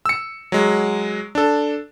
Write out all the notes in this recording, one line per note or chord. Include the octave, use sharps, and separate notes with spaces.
E6 C#7
F#3 G#3
D4 A4